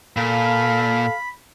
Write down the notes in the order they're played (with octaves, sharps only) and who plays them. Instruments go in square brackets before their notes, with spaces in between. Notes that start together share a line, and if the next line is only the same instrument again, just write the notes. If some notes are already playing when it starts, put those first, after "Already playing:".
[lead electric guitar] A#2 [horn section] A4 F5 [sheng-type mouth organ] B5